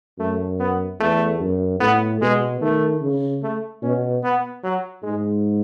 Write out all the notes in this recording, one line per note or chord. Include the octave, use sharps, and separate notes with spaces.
F#2 A3
B3
E2 A3
F#2
A2 B3
B2 G#3
D#3 A3
C#3
A3
B2 C#4
B3
F#3
G#2 G#3